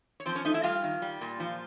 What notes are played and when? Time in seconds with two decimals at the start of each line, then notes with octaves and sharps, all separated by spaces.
0.20 C#5
0.26 F3 C4 C5
0.35 C#4 C#5
0.45 A3 D#4 D#5
0.54 E4 E5
0.63 G3 F4 F5
0.83 D#3
1.02 G3
1.21 A#2
1.40 F3